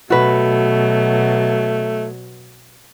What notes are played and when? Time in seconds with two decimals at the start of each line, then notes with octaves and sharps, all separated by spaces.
0.10 B2 F#3 A3 F#4 B4